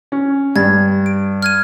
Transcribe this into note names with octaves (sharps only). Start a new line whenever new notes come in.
C#4
G2 G#6 A6
D7
F6 G#6 D#7